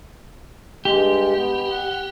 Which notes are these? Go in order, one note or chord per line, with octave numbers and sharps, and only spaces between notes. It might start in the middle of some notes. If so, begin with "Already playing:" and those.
G2 G#3 G4
B3
F#5